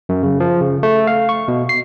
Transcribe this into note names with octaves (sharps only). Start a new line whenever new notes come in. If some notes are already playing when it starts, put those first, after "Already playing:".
F#2
C#3
F3
C#3
A3
F5
C#6
B2
C7